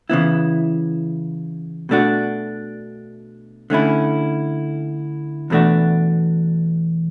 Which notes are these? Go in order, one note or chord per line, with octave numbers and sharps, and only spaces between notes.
C#3 E3 B3 E4
B2 A3 D4 F#4
D3 A3 C#4 E4
E2 B2 A3 D4 F#4